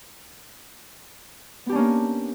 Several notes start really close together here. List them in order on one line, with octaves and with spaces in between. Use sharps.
B3 G4 D4 C#4 A#3